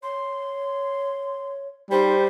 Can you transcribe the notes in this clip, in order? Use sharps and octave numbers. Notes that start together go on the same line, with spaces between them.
C#5 C6
G3 D#4 C5